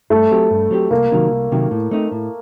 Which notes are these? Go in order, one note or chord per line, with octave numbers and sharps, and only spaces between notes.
G2 A3
F#3 C4 G4
G2
F#3 C4 G4
C2 A#3
C3 D#3 F#3
C2
C3 D#3 F#3
A2
A3 C4 D#4
A2